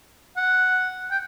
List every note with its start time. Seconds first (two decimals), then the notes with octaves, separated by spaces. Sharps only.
0.37 F#5
1.11 G5